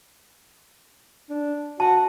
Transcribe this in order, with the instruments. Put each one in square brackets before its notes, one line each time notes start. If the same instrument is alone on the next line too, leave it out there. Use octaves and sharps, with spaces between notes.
[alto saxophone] D4
[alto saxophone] F#4 [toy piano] A5